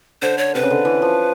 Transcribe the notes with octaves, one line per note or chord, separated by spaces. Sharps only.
D3 C5
C#5
C3 B4
C#3
D3
E3
F3